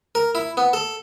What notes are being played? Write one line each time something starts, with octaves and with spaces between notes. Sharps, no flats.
A#4
E4
B3
A4